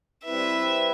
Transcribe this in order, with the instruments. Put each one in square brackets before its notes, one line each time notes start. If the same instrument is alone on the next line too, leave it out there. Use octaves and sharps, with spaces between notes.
[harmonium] G3 C4 E4 B4 [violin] E5